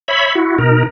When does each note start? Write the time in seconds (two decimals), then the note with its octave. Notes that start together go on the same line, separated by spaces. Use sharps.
0.08 C#5 E5 B5
0.35 E4 F#4
0.58 B2 D#4 A#4